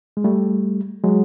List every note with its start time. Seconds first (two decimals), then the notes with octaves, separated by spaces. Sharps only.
0.17 G#3
0.24 G3 A3
1.03 F#3 G#3